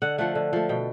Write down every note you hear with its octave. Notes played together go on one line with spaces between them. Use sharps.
D3 F#5
F3 A3 F#5
D3
F3 A3
B2 G5